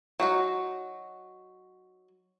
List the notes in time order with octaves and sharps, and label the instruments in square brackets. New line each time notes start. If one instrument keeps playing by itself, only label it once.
[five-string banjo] F#3 D#4 F#4